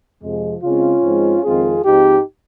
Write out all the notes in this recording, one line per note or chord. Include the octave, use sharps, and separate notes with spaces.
F2 C3 F3 G#3
C#3 G#3 C4 C#4 F4
G#2 F3 G#3 C4
F2 D#3 G#3 C4 F4 G#4
G#2 F3 G#3 C4 D#4 G4